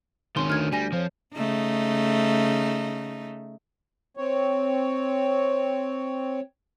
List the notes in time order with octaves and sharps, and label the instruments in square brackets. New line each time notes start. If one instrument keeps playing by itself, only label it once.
[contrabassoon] G#1 [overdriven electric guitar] D#3 C#4 [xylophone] C6
[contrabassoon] D2 [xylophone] F6 G#6
[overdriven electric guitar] G3 [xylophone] G#5 A#6
[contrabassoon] F2 [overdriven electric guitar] F3 [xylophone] C5 C#5
[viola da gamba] C#3 A3 D#4
[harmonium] C4 C#5